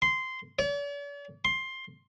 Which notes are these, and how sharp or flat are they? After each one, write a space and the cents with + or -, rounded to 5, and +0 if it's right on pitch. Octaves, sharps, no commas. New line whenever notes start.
C6 -10
D5 -45
C6 +15